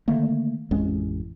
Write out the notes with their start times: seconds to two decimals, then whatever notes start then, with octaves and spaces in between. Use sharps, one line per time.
0.08 D3 D#3 A3 A#3
0.71 A1 F2 G#3 C#4